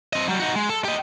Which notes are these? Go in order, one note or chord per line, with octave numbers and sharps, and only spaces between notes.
C4 D#5
F#3 G3
D#4 F#4
G#3
A4
G4 D#5